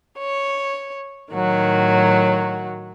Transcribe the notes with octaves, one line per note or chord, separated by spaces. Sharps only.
C#5
A2 D#3 F#3 F#4